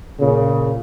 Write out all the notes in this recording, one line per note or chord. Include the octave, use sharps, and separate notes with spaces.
A#2 C#3